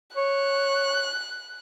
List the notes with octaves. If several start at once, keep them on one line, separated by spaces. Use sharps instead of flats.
C#5 F#6